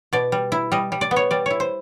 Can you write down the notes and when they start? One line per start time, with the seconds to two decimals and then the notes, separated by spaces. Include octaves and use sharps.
0.13 B2 D5
0.32 G3
0.52 E4
0.72 G3 D#5
0.92 G3
1.01 D5
1.11 B3
1.16 C#5
1.31 G3 D5
1.46 E4 C#5
1.60 C5